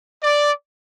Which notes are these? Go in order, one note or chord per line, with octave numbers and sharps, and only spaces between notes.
D5